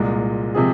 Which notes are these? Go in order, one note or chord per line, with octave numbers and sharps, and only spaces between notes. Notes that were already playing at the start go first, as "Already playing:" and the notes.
Already playing: C2 A#2 G#3
C3 F3 G#3 C4 G#4